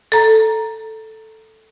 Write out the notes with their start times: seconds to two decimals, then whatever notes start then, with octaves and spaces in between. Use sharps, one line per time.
0.12 A4 A#5